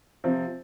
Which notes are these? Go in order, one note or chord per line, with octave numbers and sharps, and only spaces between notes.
C3 F3 C4